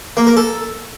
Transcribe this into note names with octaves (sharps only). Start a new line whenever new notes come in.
A#3
A#4
A4